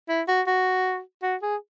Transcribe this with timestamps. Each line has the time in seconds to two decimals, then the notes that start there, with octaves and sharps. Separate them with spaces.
0.09 E4
0.28 F#4
0.47 F#4
1.23 F#4
1.42 G#4